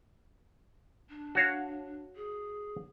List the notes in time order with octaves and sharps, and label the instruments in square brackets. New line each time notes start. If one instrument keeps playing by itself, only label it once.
[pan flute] D4
[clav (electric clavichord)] F#4 C#5 F5
[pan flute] G#4